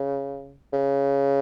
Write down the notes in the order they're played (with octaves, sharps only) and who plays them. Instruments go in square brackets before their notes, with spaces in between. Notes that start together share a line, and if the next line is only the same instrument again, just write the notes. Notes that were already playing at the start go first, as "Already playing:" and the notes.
Already playing: [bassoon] C#3
C#3